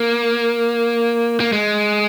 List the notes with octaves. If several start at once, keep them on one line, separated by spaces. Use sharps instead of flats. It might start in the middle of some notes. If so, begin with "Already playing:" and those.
Already playing: A#3
A#3
G#3